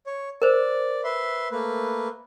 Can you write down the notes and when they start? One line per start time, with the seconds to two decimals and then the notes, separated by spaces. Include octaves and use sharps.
0.07 C#5
0.42 A#4 C5 D5
1.04 B4 E5 C6
1.51 A3 A#3 B4